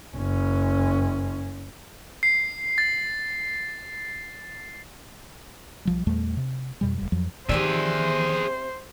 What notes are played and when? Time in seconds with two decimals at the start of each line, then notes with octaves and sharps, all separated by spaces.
0.15 F#1 C#4
2.23 C7
2.78 A6
5.85 B1 F3 G3
6.07 E2 A#2 G3 A3
6.37 C3
6.81 F2 B2 G3
6.98 E1 G3
7.12 F2 F3 F#3
7.49 C3 D#3 E3 C4 G#4 C5 D5 E5